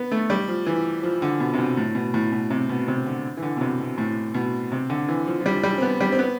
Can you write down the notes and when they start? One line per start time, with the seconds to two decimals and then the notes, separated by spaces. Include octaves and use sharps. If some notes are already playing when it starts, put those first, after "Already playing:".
Already playing: B3
0.12 A3
0.30 G3
0.48 F3
0.66 E3
1.03 F3
1.22 D3
1.40 B2
1.54 C3
1.58 B2
1.77 A2
1.95 B2
2.14 A2
2.32 B2
2.50 C3
2.69 B2
2.88 C3
3.06 D3
3.37 E3
3.42 D3
3.57 B2
3.61 C3
3.80 B2
3.98 A2
4.34 B2
4.72 C3
4.90 D3
5.08 E3
5.27 F3
5.41 F3
5.46 G3
5.63 G3
5.78 C4
5.82 B3
6.01 G3
6.12 C4
6.19 B3